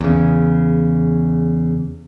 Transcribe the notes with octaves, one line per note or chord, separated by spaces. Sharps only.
E2 C#3